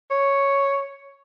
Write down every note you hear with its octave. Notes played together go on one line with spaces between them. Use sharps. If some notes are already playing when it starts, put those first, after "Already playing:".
C#5